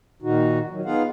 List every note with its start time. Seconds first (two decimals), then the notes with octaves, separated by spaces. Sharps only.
0.22 A#2 D#3 D#4 F#4
0.70 D#3 F#3
0.86 B3 D#4 F4 G#4 F5 F#5